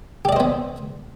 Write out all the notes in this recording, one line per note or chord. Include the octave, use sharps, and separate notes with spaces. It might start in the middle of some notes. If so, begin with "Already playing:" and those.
B3 G4 C5 D5 D#5